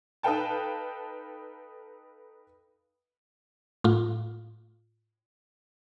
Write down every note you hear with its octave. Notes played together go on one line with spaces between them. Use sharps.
D#4 A4 B4 F5 G5 A5
A2 F4